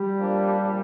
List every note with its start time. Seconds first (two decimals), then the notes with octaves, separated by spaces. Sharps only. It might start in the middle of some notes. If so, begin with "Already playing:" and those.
Already playing: G3
0.18 F3 A#3 D4
0.59 A#2